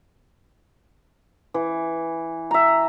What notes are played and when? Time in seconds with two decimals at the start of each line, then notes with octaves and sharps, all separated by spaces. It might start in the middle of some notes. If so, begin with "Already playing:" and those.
1.54 E3
2.51 E5 A#5